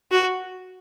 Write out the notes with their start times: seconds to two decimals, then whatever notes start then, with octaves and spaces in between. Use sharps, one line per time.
0.12 F#4